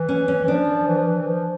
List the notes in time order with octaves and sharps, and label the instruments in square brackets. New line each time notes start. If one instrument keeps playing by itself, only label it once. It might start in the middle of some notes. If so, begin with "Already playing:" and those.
Already playing: [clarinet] E3
[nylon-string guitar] C#4
C#4
[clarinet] E3
[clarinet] F3 [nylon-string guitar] D4
[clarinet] E3
F3
E3
E3
F3